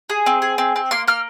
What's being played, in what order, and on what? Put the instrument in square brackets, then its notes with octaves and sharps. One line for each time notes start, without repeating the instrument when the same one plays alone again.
[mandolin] G#4
C4
G#4
C4
C4
A#3 C6
A#3 F6